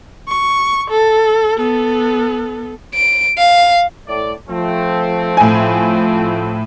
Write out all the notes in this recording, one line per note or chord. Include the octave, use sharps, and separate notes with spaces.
C#6
A4
B3 A4
D7
F5
A2 D5
F3 A3 C4
A2 G#5